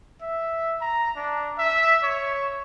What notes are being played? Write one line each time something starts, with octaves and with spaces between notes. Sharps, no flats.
E5
A#5
D4
E5
C#5